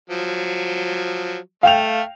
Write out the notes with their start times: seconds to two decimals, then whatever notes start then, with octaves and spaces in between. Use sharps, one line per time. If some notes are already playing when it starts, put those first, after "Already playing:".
0.10 F3 F#3
1.63 A3 F5 G5 F7